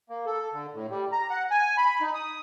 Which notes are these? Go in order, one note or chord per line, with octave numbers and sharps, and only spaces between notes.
A#3
A4
D3
A2
G3
A#5
F#5
G#5
B5
D#4
D#6